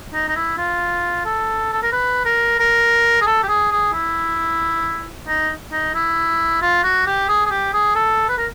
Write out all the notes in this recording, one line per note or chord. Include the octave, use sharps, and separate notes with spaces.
D#4
D#4
E4
F4
A4
A4
A#4
B4
A#4
A#4
G#4
A4
G4
G#4
G#4
E4
D#4
D#4
E4
F4
F#4
G4
G#4
G#4
G4
G#4
A4
B4
A#4